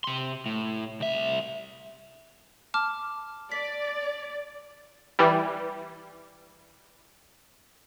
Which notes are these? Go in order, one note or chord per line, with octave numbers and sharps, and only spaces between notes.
C3 C6
A2
C2 E5
A5 D6 F6
D5 B6
E3 G3